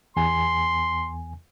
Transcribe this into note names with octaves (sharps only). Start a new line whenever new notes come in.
E2 G#5 C6